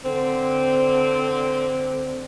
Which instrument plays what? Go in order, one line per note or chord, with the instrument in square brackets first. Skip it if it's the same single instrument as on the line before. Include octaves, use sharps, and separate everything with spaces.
[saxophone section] D3 C4